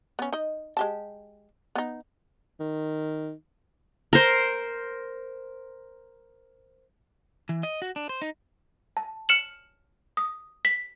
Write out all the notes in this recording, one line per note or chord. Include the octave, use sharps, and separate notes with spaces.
B3 C#4
D#4 D#5
G#3 G4 A5
B3 D#4
D#3
A#4 C5
E3
D#5
F#4
D4
C5
D#4
A5
F6 C#7 E7 F#7
D#6
B6